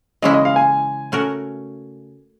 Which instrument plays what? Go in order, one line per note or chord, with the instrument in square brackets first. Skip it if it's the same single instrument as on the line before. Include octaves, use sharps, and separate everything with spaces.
[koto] C#3 E3 G#3 C#4 E4 [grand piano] D#5
[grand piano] D#5
F5
G#5
[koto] A3 C#4 F#4 A#4